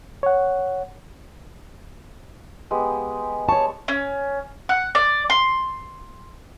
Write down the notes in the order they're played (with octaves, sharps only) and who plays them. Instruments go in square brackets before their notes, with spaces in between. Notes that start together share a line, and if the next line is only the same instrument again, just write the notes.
[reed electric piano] C#5 F#5
[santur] G#3 B3 G4
[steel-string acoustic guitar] C#5 A5 [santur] C#6
[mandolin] C#4
F#5
D5
C6